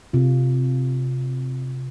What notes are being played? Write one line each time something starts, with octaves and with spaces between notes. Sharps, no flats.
C3 F4